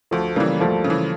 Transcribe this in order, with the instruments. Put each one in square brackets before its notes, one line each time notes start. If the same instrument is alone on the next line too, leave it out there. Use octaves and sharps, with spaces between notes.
[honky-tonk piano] D2 [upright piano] F3 A3
[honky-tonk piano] C#3 E3 [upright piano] G3 A#3
[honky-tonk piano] D2 [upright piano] F3 A3
[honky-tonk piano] C#3
E3